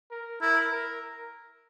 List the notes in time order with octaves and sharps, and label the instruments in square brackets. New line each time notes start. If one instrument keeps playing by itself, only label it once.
[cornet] A#4
[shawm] E4 [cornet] A#4
[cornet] A#4